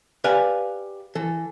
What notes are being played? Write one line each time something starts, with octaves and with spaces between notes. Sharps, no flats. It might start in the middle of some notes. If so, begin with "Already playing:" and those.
G4 B4 D5 F5 G5 G#5
E3 A4